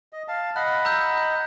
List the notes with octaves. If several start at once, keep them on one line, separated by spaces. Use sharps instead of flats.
D#5
F5 A5
D#5 F#5 B5 F#6
A#5 E6 G6